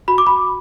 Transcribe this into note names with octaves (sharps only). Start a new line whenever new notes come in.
F#4 B5
D6
B5